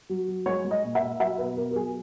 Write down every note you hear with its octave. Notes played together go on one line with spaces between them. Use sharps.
F#3
F#3
G#3 C#5
G#3
D#5
A#2
E5
A#2
F#3 E5
B2 B4
B2 A#4
A#4
F#3 G#4